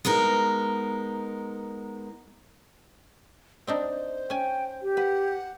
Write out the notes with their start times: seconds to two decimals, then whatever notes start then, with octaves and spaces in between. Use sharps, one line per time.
0.05 G#3 B3 D#4 A#4
3.67 C4 D4 D#4 C5
4.30 C#4 G5 G#5
4.82 G4
4.97 B4 F#5